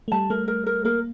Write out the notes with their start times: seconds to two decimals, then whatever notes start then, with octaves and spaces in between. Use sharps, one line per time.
0.08 A3
0.12 G3 A5
0.30 A3 A#4
0.48 A#4
0.66 A#4
0.85 A#3 A#4